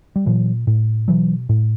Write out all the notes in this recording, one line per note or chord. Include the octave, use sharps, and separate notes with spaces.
G3
A#2 E3 F#3
A2
B2 E3 F#3
A2